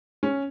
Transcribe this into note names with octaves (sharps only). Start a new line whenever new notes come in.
C#4